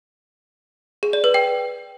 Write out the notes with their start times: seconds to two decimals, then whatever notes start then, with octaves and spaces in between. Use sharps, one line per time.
1.03 G#4
1.13 D5
1.24 B4
1.34 G5